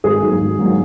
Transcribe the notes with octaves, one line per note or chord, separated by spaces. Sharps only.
G#1 G#4
G#2 F#3 A#3
G#1
G#2 F#3 A#3